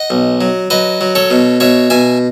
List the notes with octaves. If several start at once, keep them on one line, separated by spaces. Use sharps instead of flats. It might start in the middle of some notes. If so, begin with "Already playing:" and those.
Already playing: D#5 F#5
B1
F#3
F#3 B4 D#5
F#3
A4 C#5
B2
B2 C#5 E5
B2 E5 G#5